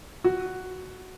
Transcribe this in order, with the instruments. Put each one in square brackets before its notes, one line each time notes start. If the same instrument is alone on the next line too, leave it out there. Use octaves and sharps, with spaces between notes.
[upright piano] F#4